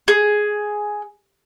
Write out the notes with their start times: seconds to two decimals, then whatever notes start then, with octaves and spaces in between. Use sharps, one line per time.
0.08 G#4